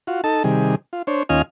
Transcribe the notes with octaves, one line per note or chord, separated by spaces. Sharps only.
F4 F#4
D#4 A4 A5
C3 D#3 G3 G#4
F4
D4 C5 C#5
D#2 C#4 F4 D#5 G#5 F6